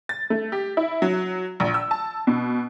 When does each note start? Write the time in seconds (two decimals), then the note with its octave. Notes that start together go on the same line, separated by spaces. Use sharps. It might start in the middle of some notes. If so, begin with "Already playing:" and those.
0.09 A6
0.30 A3
0.52 G4
0.77 E4
1.02 F#3
1.60 A#1
1.74 E6
1.91 A5
2.27 B2